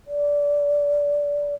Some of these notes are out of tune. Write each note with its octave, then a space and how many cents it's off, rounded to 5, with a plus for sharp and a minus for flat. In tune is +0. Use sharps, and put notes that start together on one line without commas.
D5 -20